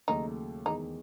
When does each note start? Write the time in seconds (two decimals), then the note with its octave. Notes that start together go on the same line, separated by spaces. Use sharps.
0.08 D#2 C#3 F#3 A3 D#4
0.65 E2 D#3 G#3 D#4